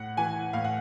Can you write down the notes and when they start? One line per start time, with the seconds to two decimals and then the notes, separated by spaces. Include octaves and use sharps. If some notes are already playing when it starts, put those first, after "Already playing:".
Already playing: A2 F#5
0.17 E3 G#5
0.53 A2 F5
0.64 F#5